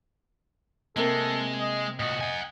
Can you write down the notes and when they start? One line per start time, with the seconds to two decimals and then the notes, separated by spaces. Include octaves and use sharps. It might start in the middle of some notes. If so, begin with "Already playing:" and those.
0.97 C3 G#3 A#3 C4 A4
1.60 D#5
2.00 A#2 F#4 D#5
2.21 F#5 G#5